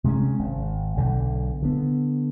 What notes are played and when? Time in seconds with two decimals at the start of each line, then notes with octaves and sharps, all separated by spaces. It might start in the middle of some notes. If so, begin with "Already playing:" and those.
0.04 C3 G#3 C4 C#4
0.39 G#1
0.97 B1 D3
1.62 D3 B3